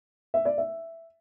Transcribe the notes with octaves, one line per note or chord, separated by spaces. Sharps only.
E5
D5
E5